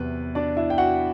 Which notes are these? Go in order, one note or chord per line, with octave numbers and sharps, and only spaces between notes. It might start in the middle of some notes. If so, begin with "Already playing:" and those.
Already playing: E2 C3 F#3 B4
D4 D5
E4 E5
G5
F#4 F#5